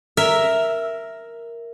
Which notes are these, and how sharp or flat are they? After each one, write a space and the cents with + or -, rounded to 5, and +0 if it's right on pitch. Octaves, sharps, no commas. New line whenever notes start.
A#4 +0 E5 +0